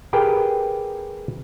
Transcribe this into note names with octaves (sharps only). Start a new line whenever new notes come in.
G4 G#4 A#4 B4 G5